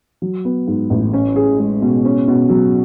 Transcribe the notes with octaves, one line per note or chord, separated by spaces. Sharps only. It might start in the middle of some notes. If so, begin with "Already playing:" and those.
F#3
B3
G#2
A1
C#4
G#4
G#3
B2
C#4
B2
F#3